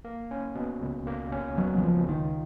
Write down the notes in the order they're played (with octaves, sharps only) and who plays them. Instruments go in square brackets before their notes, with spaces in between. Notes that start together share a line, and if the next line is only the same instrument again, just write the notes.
[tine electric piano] A#3
C#4
B2
C#2
A#3
C#4
[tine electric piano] B2 [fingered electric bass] F#3
[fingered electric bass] F#3
[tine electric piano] C#2 [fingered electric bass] F3
[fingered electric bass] D#3 [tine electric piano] F4